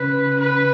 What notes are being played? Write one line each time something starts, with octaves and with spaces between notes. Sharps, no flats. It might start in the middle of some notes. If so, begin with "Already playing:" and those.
Already playing: C#3 B4
B4